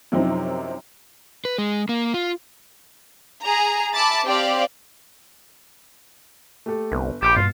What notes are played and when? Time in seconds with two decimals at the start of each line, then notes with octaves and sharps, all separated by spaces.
0.12 F#2 C3 F3 C4 D#4 E4
1.45 B4
1.58 G#3
1.89 A#3
2.14 F4
3.41 G#4 A#5
3.94 E5 A5 B5 D6 A6
4.25 C4 G4 D5 F5
6.66 A3 G4 A4
6.92 G1 C2
7.22 A#1 G4 B5 C#7 E7
7.36 G2 B2 F4